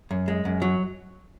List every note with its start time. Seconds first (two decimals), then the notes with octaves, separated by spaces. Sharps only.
0.11 F#2
0.28 G#3
0.45 F#2
0.62 F#3